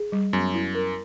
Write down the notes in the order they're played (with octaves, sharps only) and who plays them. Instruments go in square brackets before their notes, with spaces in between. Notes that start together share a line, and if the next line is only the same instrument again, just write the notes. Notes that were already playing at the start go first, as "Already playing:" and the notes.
Already playing: [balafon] G#4
G3
[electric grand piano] F#2 [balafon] B3
[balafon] E4
A#4